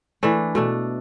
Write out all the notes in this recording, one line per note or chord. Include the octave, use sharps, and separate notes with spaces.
E3 A3 D4
B2 A3 D4